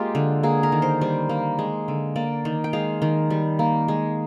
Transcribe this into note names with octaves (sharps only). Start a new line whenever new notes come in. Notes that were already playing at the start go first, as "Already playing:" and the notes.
Already playing: G#3 A#3 F4 G4
D3
A#3 G#4
A#4
D#3
C5
G3 C5
A#3
G#3
D3
A#3 D5
D#3
G5
G#3 F5
D#3
G3
A#3
G#3